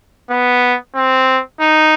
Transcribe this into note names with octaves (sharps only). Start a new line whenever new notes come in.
B3
C4
D#4